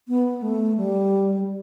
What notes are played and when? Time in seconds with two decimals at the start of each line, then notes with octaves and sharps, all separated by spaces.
0.08 B3
0.42 A3
0.77 G3